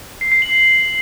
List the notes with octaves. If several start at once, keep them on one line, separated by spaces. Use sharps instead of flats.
C7
C7
F#7